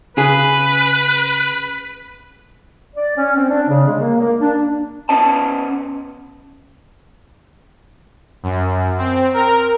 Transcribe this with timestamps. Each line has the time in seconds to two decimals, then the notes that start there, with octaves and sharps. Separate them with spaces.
0.17 C#3 G#4 B4
2.95 D5
3.17 C#4
3.36 C4
3.49 D4
3.68 C#3
3.87 G#3
3.99 A#3
4.20 A#3
4.40 D4
5.09 B3 C#4 D#5 A5
8.43 F#2
8.98 C4
9.34 A#4